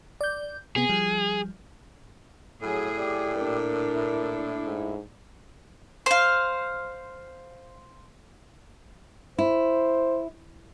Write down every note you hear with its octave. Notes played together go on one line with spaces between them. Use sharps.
D5 G6
C3 B3 G#4
F3 G3
A2 F#3 G#4
G4 D5
A#2 D4 A#4
E4
G#2
C5 F5
E4 C5